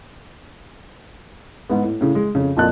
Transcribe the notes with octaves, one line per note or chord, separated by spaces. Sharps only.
G#2 B3
A2
A2 C#3
G#3
F2 C#3
A#1 F2 A#2 D#5 A5 F#6